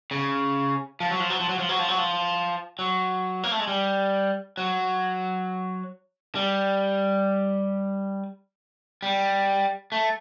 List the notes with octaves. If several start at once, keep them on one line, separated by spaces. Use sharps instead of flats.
C#3
F3
F#3
F3
F#3
F3
F#3
F3
F#3
F3
F#3
F3
F#3
A#3
A3
G#3
G3
F#3
G3
G3
A3